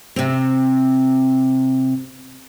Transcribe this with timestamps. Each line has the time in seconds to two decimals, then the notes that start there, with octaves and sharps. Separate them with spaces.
0.16 C3 C4